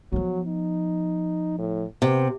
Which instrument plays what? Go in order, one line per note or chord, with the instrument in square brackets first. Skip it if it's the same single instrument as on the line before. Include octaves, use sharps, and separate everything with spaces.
[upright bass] F3 B3 [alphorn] F#3
[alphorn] D#4
A2
[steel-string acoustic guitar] C3 [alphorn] B3